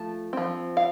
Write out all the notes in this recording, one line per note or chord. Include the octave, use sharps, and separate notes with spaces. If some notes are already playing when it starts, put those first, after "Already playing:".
Already playing: F3 A3 A5
F3 C4
F5